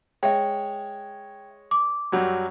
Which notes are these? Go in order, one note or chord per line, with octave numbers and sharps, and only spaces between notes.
G#3 C#5 E5 G5
D6
F#2 F#3 G3